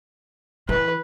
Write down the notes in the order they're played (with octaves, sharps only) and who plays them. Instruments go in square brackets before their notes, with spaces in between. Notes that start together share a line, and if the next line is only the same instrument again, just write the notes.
[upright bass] E3 [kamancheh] B4